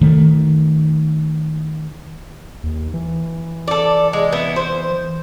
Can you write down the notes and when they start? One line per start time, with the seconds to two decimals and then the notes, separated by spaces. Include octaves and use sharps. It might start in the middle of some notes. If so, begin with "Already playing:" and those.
0.01 D#3 A3
2.63 D#2
2.94 E3
3.68 A4 D5
4.13 G#3
4.32 B3 E4
4.56 C5